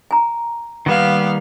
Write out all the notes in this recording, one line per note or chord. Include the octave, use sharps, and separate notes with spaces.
G#5 A#5
D#3 G3 A#3 B3 F5